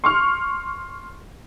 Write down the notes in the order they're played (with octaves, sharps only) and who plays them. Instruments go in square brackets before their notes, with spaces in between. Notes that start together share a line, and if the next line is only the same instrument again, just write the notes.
[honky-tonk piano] C6 C#6 F6